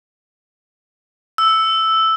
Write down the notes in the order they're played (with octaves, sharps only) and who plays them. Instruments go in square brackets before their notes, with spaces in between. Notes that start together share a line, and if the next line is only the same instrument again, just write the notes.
[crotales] E6